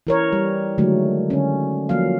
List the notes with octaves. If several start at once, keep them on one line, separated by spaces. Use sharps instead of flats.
E3 A#4 C#5
G3
D3 D#3 F#3 G#3 A3
D3 C#4
F3 F#3 A#3 F5